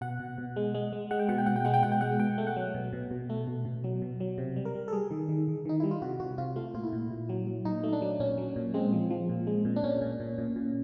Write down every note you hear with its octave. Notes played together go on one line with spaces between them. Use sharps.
B2 F#5
B2
B2
G#3
G#3
G#3
G#3 F#5
G5
B2 F#5
G5
B2 F#5
G5
G#3 F#5
G5
B2 F#5
G5
G#3 F#5
B2 G5
A3
F#5
F#3
B2
B2
B2
A3
B2
B2
F#3
B2
F#3
C3
G3
A#4
G3
A4
G3 G#4
D#3
D#3
D#3
D#3 D#4
G3 E4
F4
C3 F#4
C3 F#4
C3 F4
A3 F4
A#2 F4
E4
A#2
A#2
F#3
F#3
A#2 D#4
A3
D4
F#3
A#2 C#4
F#3
A#2
G#3 C4
F3
F3
A#2
G#3
A#2
D4
A#2 C#4
A#2
A#2
A#2
A#2